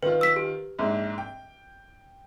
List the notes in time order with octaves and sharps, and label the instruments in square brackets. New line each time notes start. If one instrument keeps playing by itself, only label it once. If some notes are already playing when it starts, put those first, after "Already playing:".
[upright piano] D#3 F4 [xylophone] B4
[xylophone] E6 B6
G4
[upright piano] A#1 G#2
G5